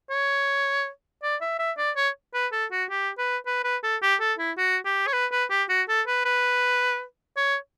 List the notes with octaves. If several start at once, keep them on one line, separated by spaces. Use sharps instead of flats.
C#5
D5
E5
E5
D5
C#5
B4
A4
F#4
G4
B4
B4
B4
A4
G4
A4
E4
F#4
G4
C#5
B4
B4
G4
F#4
A4
B4
B4
C#5